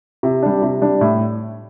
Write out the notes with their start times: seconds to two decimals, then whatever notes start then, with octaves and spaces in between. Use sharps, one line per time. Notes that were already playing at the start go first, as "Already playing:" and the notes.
0.23 C3
0.43 G3 D4
0.62 C3
0.82 G3 D4
1.01 A2